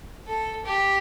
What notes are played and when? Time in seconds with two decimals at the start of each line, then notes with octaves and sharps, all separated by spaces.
0.28 A4
0.65 G4